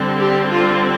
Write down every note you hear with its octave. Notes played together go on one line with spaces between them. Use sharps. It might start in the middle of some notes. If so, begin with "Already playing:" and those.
Already playing: D3 G3 C4
G4
F4